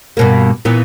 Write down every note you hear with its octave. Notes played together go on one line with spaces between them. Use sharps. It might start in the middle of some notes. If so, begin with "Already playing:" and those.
G2 B2 A#3
A#2 E3 B3